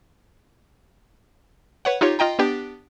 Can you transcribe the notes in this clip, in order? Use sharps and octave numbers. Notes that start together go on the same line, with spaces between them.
B4 C#5 F#5
D#4 F4 G4 C#5
F4 D#5 G5 A#5
B3 D4 G4